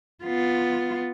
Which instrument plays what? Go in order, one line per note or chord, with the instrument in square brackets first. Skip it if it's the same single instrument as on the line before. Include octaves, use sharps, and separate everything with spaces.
[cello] B3 F4